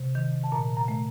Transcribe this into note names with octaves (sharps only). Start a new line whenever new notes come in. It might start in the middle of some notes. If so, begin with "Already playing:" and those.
Already playing: C3
D#3
A5
A#2 A#5
A#5
A3